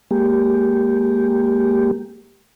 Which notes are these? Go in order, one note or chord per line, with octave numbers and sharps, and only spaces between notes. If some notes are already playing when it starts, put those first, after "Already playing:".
G#3 A#3 G4